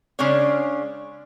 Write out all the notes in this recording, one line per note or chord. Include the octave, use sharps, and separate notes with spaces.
C#3 G#3 C#4 D4 C#5